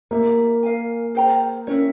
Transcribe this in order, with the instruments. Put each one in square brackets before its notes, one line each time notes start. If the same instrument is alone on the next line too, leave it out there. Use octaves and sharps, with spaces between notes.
[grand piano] A#3 [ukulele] E4 G4 C#5 E5
[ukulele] A#4 F5 G#5
G#4 C5 G5 A#5
[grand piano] C#4 [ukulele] E4 A#4 C#5